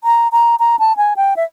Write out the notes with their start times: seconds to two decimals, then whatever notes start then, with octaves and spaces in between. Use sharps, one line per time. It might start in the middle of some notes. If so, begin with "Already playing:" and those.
0.04 A#5
0.32 A#5
0.59 A#5
0.79 A5
0.97 G#5
1.17 G5
1.36 E5